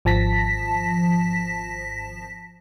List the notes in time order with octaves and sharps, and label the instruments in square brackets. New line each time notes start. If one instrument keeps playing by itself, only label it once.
[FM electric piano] G#1 F3 A5 A#6 B6